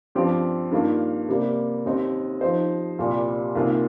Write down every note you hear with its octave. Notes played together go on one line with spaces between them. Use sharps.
G2 F3 C4 G4
G2 D#3 A#3 F4
C3 G3 A#3
D#2 D#3 C4 D#4
F3 D#4 C5
C2 A#2 G3
C2 C3 D#3 A#3 F4